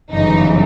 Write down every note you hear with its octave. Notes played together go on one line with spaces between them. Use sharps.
G1 F#2 C#3 E3 D#4